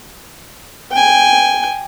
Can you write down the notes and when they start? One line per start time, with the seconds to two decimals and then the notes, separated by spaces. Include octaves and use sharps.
0.92 G5 G#5